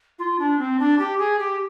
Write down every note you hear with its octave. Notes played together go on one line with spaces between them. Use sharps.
F4
D4
C4
D4
G4
G#4
G4